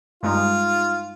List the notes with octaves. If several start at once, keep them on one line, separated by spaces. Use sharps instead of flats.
G2 G#3 D#4 F4